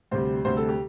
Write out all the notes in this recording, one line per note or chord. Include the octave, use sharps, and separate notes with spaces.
D2 C3 G3 C5
D2 C3 G3 C5
A4
G4